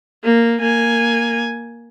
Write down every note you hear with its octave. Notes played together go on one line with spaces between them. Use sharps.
A#3
A#3 G#5